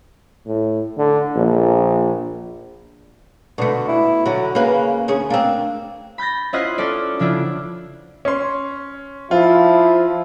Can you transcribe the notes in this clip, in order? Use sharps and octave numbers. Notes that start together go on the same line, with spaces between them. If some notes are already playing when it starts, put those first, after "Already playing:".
A2
D3
A#1
B2 D3 A3
E4
D3 F#3 F#4
C#3 A#3 B4
D2 C#4 G#4
A#3 C4 D4
B5 G6 A6 A#6
C#4 E4 F4 C5 D#5 F#5
C#4 A4 D5
C#3 F3 D4 E4 F4
C#4 C6
F3 E4 F4